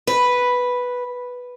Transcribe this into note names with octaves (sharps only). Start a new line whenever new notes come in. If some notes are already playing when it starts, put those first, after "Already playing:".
B4